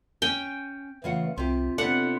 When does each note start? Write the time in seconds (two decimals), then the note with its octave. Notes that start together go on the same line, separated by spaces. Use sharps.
0.22 C#4 G5 G#5
1.04 C#3 E3 A3 F4 F#5
1.38 C2 C3 F4 G4
1.78 C3 B3 D4 A4 F#5